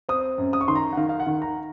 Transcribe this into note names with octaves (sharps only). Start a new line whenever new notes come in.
C4 D#6
F#2
D#6
C#6
D#3 C6
A#5
F#5
D#3 F5
F5
F#5
D#3
A#5